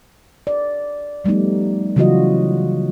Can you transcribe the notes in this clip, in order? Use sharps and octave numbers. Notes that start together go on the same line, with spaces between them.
D5
F3 G3 A3 B3 D#4
C#3 E3 F#3 F4 F#4 D#5